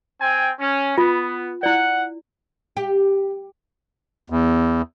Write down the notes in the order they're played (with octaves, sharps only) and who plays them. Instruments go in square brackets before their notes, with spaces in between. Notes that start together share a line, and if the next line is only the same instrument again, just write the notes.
[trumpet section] C4 G5 G#5
C#4
[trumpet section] B3 [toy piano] F4
[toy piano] E4 D5 [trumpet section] F#5
[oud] G4
[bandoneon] E2